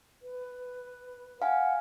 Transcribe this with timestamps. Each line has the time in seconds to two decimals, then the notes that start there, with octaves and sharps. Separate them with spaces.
0.22 B4
1.42 F5 F#5 G#5